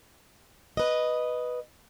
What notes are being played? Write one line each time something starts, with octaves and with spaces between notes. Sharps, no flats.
B4 D#5